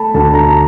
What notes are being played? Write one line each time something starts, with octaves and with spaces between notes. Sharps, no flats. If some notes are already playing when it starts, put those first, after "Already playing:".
Already playing: A3 A5 B5
D2 A5
A#5